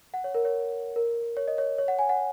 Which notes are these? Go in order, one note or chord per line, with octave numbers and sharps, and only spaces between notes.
F#5
C#5
A#4
C#5
A#4
C#5
D#5
C#5
C#5
F#5
G#5
F#5